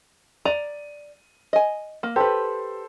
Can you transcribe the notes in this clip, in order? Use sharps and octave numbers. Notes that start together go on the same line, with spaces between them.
D5 A#5 D#7
D#5 G#5
A#3
G4 A4 B4 C5